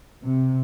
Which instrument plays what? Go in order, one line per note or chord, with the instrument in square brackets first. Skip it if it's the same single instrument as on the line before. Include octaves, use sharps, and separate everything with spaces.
[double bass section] C3